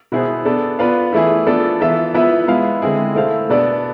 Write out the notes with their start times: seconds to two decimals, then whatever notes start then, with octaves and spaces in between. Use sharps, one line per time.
0.12 B2 B3 E4 G#4 C5
0.45 B3 D4 A4
0.79 B3 F4 B4 D5 F5
1.13 E3 A3 E4 G#4
1.46 F3 B3 D4 A4
1.80 E3 B3 F4 A4 E5
2.14 F3 B3 E4 B4 E5
2.48 G#3 B3 E4 B4 F5
2.82 D3 G#3 C4 E4 G#4
3.15 A3 E4 A4 C5 F5
3.49 B2 B3 D4 A4 D5